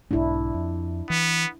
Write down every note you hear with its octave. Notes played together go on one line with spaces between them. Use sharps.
B1 G#2 D4 E4
F2
E3 B3